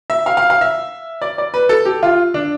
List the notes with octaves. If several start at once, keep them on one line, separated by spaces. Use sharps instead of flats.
E5
F5
F5
F5
E5
D5
D5
B4
A4
G4
F4
D4